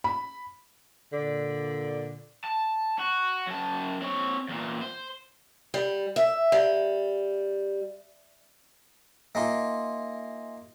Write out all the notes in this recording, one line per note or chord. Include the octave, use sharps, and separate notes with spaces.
B5
A#2 D3 D5
A5
F#4
F#2 A5
C4 C#5
E2 A#2
C5
G3
E5
G3
A#3 D#4 F4 E5 G#5 C6